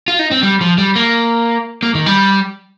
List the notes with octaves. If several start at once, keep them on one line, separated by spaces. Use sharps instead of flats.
F4
D#4
C4
G3
F3
G3
A#3
A#3
D#3
G3